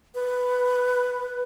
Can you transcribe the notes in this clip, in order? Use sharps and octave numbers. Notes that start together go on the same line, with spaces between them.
B4